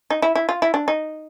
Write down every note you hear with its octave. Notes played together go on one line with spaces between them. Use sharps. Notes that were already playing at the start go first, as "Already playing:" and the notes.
D#4
E4
E4
F4
E4
D4
D#4